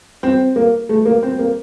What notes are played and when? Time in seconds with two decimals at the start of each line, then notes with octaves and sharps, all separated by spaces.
0.23 C4
0.56 A#3
0.89 A3
1.05 A#3
1.23 C4
1.39 A#3